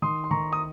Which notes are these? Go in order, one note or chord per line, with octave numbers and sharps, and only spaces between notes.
D#3 C6 D#6
C6
D#3 A#5 C#6
D#6